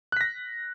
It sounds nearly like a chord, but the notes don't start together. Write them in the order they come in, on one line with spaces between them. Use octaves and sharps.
F#6 B6 A#6